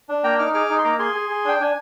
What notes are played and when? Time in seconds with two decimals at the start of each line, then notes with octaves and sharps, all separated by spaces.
0.09 D4
0.23 A#3 G5 A#5
0.39 D#4 D6 F6
0.54 G#4 D6 F6
0.69 D#4
0.79 C6
0.84 A#3 A#5 D6
0.99 G#4 G#5 C6
1.15 G#4
1.29 G#4
1.45 D4 G5
1.60 D4 G#5